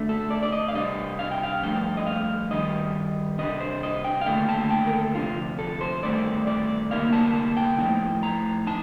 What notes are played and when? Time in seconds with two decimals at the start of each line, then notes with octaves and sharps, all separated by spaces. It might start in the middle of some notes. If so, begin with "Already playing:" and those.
Already playing: D2 D3 A3
0.09 A4
0.30 D5
0.43 D5
0.52 D#5
0.68 F5
0.74 C3 G3 D4 D#5
1.19 F5
1.31 G5
1.43 F5
1.63 G2 F3 A3 D4 G5
1.97 D#5
2.07 F5
2.50 G2 D#3 G3 D#5
3.38 C3 G3 D4 D#5
3.61 C5
3.83 D#5
4.04 G5
4.21 F5
4.26 D#2 D3 A3 D4 G5
4.49 A5
4.70 G5
4.87 A#4
4.93 A4
5.14 D2 C3 F3 F4
5.59 A4
5.81 C5
6.03 G2 D#3 A3 C4 D5
6.47 D5
6.91 D2 C3 G3 A#3 D#4 F5
7.13 A5
7.35 A5
7.57 G5
7.78 A2 F3 C4 D#4 G5
8.23 A#5
8.67 D#4 A5